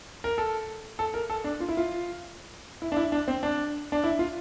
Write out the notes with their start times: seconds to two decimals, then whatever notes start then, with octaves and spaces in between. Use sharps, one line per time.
0.24 A#4
0.38 A4
0.99 A4
1.14 A#4
1.30 A4
1.44 D4
1.60 F4
1.69 E4
1.77 F4
2.82 E4
2.92 D4
2.97 E4
3.12 D4
3.28 C4
3.43 D4
3.92 D4
4.04 E4
4.19 F4